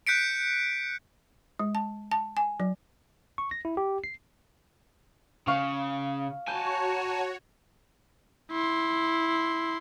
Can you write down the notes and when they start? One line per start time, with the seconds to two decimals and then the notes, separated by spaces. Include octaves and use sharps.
0.07 F#6 G6 B6 C#7 D7
1.59 G#3
1.75 A5
2.12 A5
2.37 G#5
2.60 F#3
3.38 C#6
3.51 A#6
3.65 E4
3.77 G4
4.04 C7
5.47 C#3 F5 C#6
6.48 F#4 C#5 G#5 A5 G6
8.51 E4 C6